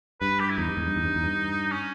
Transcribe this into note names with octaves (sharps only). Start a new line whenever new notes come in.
G2 B4
G4
E4
E2 D#4
G2
E2 G#2
G2
E2
G2
E2
G2
C#4